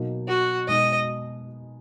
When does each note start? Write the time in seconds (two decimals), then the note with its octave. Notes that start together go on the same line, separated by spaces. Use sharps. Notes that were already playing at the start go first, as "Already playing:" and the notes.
Already playing: B2 F#3 A#3 D#4
0.28 F#4
0.68 B2 G#3 D#4 D#5